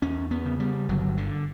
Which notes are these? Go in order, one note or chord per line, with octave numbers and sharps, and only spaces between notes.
E2 C#4
B3
C#3
G3
G1 F#3
D3